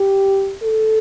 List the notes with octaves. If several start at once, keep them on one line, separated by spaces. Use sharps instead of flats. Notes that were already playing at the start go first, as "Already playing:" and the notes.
Already playing: G4
A4